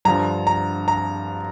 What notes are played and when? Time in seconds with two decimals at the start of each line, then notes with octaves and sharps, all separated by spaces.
0.05 G2 D3 F3 A#5
0.47 A#5
0.88 A#5